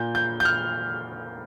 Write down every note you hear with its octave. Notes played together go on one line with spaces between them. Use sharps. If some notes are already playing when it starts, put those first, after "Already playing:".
Already playing: A#2 G6
G6
G6
F6